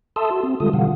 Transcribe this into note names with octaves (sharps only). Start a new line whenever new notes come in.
A4 E5 A5 C6 D#6 E6
F#4
C4
D3 G3 G#3 F4 A4 D#6
B2 D3 E3 G3 F5 F#5